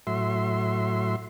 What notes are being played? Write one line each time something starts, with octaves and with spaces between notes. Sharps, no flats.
A2 F#3 E5 C6